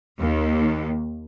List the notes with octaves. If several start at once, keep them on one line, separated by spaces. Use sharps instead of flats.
D#2